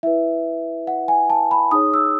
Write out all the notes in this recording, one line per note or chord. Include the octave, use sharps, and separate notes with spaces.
E4 B4 E5
F#5
G#5
A5
B5
D#4 G#4 C#5 D#6
E6